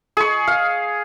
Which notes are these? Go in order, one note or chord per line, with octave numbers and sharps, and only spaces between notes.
G#4 C#6
F5